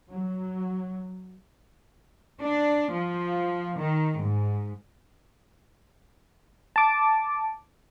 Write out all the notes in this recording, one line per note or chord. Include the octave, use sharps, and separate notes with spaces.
F#3
D4
F3
D#3
G#2
A5 D6